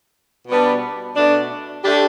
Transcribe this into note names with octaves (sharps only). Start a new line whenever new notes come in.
B2 G3 B3 D4
B2 A3 D4
D3 A3 D4 G4